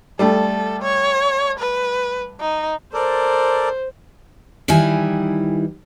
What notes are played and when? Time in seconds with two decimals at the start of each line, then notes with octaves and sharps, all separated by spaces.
0.19 G3 A3 A4
0.82 C#5
1.59 B4
2.40 D#4
2.93 A4 A#4 C5 D5
4.68 D#3 E3 G3 E4 G#5